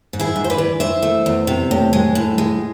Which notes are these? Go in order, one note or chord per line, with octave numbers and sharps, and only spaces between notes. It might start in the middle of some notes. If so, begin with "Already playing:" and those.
G#2
E4 G#4
G#2
C5
B4 D5
E3
E3 C5 E5
A3
E2
C3
A2
G#3
A2
G#3